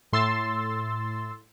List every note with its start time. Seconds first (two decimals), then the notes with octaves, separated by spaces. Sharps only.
0.13 A2 C6 E6 A6